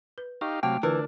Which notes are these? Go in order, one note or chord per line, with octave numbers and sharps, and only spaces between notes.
B4
D#4 G4 F5 C#6
C3 F#3 A3 F5 G5 A5 D6
D3 E3 D4 F4 A#4